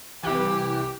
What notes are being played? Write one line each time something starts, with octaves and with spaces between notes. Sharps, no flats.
C2 E3 G4